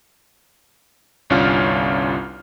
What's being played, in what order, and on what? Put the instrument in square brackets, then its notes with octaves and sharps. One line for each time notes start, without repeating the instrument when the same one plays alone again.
[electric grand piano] G1 C2 C#4 D4 F4 F6